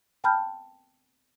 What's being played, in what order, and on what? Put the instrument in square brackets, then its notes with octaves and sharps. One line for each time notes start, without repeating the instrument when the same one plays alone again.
[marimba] G5 A5 B5 F6 G6